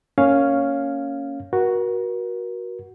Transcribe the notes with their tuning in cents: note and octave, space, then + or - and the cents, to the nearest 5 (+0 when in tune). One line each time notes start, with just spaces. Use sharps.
A#3 -15 C#4 +0 F5 +0
F#4 +0 A#4 +35